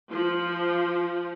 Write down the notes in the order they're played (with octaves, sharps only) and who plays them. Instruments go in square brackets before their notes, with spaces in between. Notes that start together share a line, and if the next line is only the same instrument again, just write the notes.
[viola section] F3